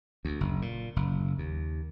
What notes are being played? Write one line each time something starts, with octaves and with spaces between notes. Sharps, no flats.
D2
F#1
A#2
F#1
D#2